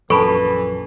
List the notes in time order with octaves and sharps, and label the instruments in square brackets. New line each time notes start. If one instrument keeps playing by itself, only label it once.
[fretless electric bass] A#1 F#2 [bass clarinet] E3 [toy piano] A4 [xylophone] A5 B5 C#6